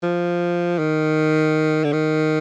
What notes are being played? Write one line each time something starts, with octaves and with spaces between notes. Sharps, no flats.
F3
D#3
D3
D#3